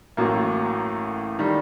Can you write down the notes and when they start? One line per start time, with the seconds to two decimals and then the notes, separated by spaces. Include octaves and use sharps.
0.17 A1 A2 F#3 A#3
1.39 D#3 G3